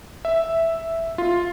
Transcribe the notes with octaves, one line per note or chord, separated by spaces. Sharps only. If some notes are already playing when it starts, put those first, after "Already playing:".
E5
F4